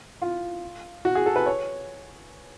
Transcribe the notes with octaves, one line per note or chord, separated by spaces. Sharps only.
F4
F#4
G#4
A4
B4
C#5